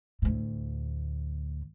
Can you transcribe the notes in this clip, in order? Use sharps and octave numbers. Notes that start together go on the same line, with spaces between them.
D2 A2